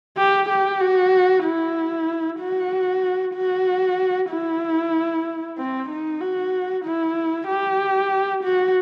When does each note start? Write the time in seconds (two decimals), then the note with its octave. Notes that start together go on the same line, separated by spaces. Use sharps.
0.17 G4
0.49 G4
0.80 F#4
1.44 E4
2.39 F#4
3.34 F#4
4.30 E4
5.57 C4
5.89 D#4
6.20 F#4
6.85 E4
7.48 G4
8.43 F#4